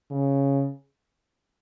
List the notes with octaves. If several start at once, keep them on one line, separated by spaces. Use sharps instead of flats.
C#3